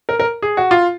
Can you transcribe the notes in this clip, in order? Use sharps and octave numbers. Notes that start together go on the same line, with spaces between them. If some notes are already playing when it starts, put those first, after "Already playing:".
A#4
A#4
G#4
F#4
F4